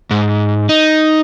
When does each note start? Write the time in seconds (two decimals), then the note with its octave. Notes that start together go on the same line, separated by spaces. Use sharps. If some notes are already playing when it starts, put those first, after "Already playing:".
0.11 G#2
0.69 D#4